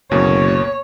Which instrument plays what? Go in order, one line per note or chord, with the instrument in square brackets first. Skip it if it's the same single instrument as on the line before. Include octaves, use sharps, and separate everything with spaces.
[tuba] F#1 [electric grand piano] D2 B2 A#3 [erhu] C#5